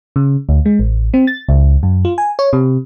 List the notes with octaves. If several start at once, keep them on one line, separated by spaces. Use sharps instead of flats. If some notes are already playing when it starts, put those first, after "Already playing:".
C#3
D2
G#3
A1
C4
A6
C#2
F#2
F4
G#5
C#5
C3